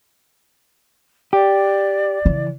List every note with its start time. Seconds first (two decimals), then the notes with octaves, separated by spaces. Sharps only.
1.33 G4 D5
2.25 C#3 E3